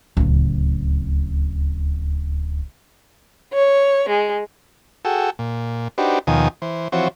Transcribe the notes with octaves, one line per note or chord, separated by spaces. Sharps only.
D1 C#2
C#5
G#3
F#4 G#4 A4 G5 E6
A#2
D4 D#4 F#4 G4 B4 C5
D#2 B2 D#3 F3 G#5 D#6
E3 C5
E3 F3 C4 F#4 C5 C#5